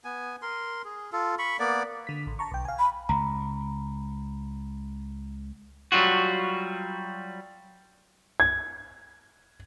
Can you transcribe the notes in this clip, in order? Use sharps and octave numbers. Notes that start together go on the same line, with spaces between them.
B3 G#5
A#4 C6
G#4
F4 A4
B5 C#6
A#3 B3 D5
D3 B6
A1
A5 A#5 C#6
B1 G5
F5 G#5
B5
C#2 A#5 B5
F#3 G3 F4 F#4
G#6